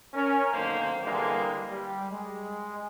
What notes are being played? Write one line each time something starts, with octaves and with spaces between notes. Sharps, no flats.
C#4 A#4
B1 D3 D#3 A#3 C5
D3 E3 G3 G#3 A#3 D4
G3
G#3